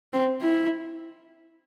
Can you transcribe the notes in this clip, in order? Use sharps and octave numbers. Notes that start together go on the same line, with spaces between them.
C4
E4